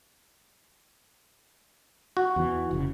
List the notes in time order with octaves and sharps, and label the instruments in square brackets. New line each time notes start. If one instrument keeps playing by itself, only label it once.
[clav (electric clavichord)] F#4
[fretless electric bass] E2 E3
F1 C#3